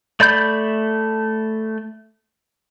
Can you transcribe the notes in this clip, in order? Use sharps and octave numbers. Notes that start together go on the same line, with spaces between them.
A3 D5 B5 G6